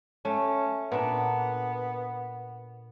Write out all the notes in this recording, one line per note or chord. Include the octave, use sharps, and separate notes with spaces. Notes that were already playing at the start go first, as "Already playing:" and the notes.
A3 C#4
A#2 B3 D4